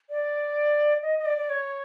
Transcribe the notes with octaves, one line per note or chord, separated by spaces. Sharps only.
D5
D#5
D#5
D5
D5
C#5